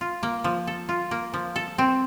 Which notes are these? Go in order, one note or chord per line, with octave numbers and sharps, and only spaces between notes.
F4
A#3
F3
A4
F4
A#3
F3
A4
C4